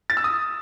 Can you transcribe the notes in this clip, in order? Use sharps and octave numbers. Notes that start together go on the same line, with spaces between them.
A6
E6
D#6